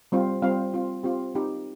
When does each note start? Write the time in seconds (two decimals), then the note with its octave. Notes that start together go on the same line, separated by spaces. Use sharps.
0.12 G3 C4 F4
0.42 G3 C4 F4 F5
0.74 C4 F4
1.03 C4 F4 G4
1.35 C4 D#4 G4